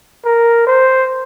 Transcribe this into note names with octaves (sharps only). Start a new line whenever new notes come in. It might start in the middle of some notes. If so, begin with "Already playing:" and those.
A#4
C5